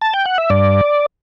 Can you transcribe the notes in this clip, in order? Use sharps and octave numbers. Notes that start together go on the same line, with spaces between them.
A5
G5
F#5
E5
G2 D5